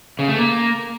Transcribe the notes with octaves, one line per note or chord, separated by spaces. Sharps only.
C#3
A3
A#3